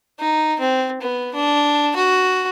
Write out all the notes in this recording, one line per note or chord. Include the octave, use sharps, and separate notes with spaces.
D#4
C4
B3
D4
F#4